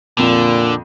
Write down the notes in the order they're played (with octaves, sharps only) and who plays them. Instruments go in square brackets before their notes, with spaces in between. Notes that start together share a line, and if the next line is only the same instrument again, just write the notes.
[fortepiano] F2 [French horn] A#2 [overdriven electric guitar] D3